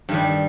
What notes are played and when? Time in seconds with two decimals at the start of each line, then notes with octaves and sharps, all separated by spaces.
0.09 G2
0.11 D#3
0.14 G3